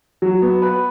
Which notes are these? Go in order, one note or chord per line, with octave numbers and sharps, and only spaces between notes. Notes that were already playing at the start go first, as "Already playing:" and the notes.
F#3
B3
B4